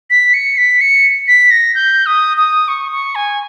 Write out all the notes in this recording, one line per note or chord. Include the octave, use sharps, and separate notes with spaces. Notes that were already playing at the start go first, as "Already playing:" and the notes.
B6
C#7
B6
C#7
B6
A#6
G6
D#6
D#6
C#6
C#6
G#5